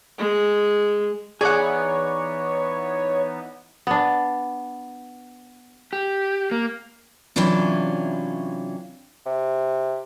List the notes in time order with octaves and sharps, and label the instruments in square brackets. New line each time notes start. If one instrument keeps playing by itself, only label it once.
[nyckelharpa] G#3
[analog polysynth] E3 B3 D#4 [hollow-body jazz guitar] G#4 [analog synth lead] C#5 [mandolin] D5 F#5
[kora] B3 D4
[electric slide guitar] G4
A#3
[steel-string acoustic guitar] C3 E3 F#3 C#4 D4 F4
[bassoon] C3